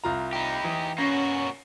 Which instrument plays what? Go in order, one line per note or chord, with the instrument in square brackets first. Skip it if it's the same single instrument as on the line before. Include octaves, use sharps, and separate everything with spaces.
[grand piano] C2 F4 A#5
[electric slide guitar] D#4 G4 [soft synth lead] B5
[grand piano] E3 [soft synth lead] D#6
[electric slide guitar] A#3 B3 F#4 [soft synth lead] C#4 [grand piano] C#6 A#6 C7